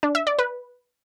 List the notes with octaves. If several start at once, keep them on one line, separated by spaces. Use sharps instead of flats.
D4
E5
D5
B4